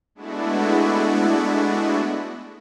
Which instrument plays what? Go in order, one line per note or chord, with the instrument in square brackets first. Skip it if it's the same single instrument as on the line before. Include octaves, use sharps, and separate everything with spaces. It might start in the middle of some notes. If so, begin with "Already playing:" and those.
[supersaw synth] G#3 A3 B3 D4 E4 F#4